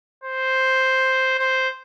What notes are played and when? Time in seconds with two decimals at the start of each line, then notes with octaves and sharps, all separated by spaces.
0.24 C5
1.39 C5